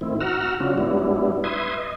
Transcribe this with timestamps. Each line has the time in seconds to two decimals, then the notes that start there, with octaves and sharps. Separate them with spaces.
0.01 A2 D#3 C4 E4
0.20 F#4 F#5 A#5 E6 F6
0.60 C#3 F#3 C#4 D4 F4 F#4
0.78 G#2 F#3 G3 B3 D4 E4
1.44 B4 E5 C6 D#6 G#6
1.78 D#5